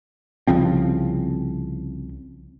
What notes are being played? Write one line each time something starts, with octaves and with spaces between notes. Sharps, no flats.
C2 C#3 F3 C4